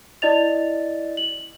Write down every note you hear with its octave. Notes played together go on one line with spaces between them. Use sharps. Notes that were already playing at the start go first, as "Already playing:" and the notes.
E4 D5 D#5 A6 F7
F#7